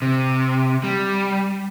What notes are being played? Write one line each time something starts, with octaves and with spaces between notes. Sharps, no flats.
C3
G3